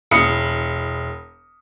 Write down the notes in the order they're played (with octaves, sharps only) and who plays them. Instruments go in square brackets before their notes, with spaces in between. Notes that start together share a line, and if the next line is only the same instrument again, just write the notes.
[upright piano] E1 B5 D#6 C#7